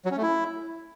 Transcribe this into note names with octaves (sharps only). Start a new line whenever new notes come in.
F#3
C#4
A3
E4